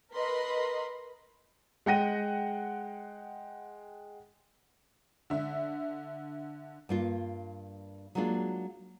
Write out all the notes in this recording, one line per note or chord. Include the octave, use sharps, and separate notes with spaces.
A#4 B4 D#5 B5 C6
G#3 F#5 G5 A#6 D#7
D3 E5
G2 A#3 F4
F#3 G#3 A#3 D4 F4